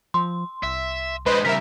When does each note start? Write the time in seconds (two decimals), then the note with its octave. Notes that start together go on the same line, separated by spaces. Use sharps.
0.14 F3 C6
0.63 C2 E5
1.26 G#3 D4 B4 C5 D#5
1.45 C#3 G3 A#4 E5 B6